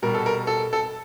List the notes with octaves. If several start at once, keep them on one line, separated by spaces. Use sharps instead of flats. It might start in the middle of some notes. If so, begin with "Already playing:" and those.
B2 G3 A#4
A4
A#4
A4
A4